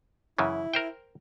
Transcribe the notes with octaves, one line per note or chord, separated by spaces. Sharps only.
F#2 C#3 E3 E4
A#4 C5 G5